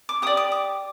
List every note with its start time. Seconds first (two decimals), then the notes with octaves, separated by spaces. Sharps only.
0.09 D6
0.22 G4 D5 D#6
0.37 D#6
0.52 D6